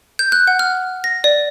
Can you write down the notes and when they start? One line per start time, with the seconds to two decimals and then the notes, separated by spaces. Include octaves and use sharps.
0.19 G6
0.32 F#6
0.47 F#5
0.59 F6
1.04 A#6
1.24 D5